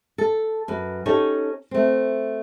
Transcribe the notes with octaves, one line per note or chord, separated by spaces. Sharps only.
A4
F#2 B4
C#4 D#4 G4 A4 C#5
A3 C4